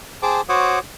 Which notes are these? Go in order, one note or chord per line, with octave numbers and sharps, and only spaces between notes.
G#4 C5 G5 A5 D6
F#4 C5 C#5 F#5 D6 D#6